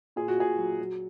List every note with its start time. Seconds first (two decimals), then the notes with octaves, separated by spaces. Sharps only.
0.16 A#2 G#4
0.28 F#4
0.38 A#2 G#4
0.58 F#3
0.79 F#3